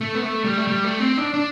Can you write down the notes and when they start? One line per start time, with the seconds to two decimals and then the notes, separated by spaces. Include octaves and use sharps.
0.01 A3
0.15 B3
0.23 A3
0.44 G3
0.57 A3
0.67 G3
0.84 A3
1.00 C4
1.17 D4
1.34 D4